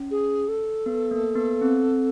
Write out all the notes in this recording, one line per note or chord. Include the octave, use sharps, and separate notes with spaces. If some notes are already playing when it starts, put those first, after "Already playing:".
Already playing: C#4
G#4
A4
B3
A#3
B3
C4